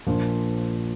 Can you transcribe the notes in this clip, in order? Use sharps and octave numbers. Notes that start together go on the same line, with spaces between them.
A#1 A#2 F3